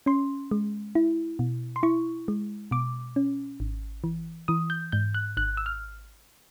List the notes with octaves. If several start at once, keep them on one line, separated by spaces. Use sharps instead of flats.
C#4 C6
G#3
E4
B2
C6
E4 C#6
G#3
B2 D6
C#4
G#1
E3
E3 D#6
G6
G#2 G6
F#6
G#1 F#6
E6
F6